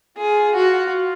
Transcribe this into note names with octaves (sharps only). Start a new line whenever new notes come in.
F4 G#4
F#4